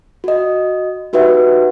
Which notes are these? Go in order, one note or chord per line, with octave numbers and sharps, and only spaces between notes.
F#4 D#5
D#4 F#4 G4 B4 E5 F#5